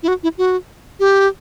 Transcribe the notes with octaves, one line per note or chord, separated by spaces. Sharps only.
E4
F#4
E4
F#4
G4